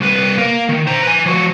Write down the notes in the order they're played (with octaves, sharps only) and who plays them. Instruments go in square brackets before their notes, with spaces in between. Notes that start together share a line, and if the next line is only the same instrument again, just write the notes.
[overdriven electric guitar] C2 B4
A#3 A#4
D#3
C5 A#5
B4 G#5
F3 F#4